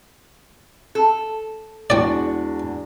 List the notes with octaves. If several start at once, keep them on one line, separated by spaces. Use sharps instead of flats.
A4
E2 G#3 D4 F#4 D5 G5